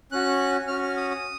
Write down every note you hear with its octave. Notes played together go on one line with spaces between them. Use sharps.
C#4 F#4 F#6
C#4 F#4 F6
F6
D#6
D#6